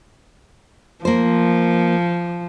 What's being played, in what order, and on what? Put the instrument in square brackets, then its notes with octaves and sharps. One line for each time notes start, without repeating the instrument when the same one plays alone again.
[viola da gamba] F3 [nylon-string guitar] A#3 C5